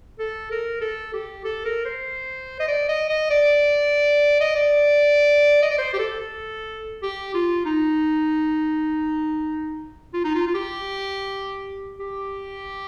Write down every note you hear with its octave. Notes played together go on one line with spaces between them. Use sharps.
A4
A#4
A4
G4
A4
A#4
C5
D#5
D5
D#5
D#5
D5
D#5
D5
D#5
D5
C5
G4
A4
A4
G4
F4
D#4
F4
D#4
F4
F4
G4
G4